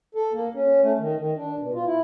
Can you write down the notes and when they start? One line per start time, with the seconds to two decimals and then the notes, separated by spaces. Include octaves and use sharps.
0.15 A4
0.33 A#3
0.54 C#4
0.82 A3
0.99 D#3
1.16 D#3
1.37 D4
1.60 B2
1.74 F4
1.86 E4